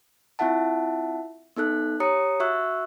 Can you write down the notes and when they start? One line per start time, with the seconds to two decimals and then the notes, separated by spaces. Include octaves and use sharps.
0.39 C4 E4 F4 E5 F#5 A5
1.56 B3 D#4 A4 F#6
2.00 G4 C#5 A#5 D#6 C#7
2.40 F#4 E5 C#6 E6 F#6